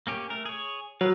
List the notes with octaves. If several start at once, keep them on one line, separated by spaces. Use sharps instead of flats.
A#3 C#4 G4
A3 A#4
G#4 C#5
F#3 B4 F5